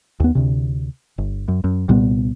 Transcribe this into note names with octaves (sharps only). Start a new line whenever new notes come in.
D#2 B3
D2 C3
G1
F#2
F#2
C2 A#2 G3 B3